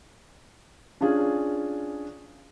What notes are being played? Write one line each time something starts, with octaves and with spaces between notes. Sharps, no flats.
C#4 D4 F4 G#4